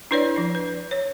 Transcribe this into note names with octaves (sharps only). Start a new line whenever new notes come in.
D4 E4 B4 C#5 D5
F3 D4
B4
C#5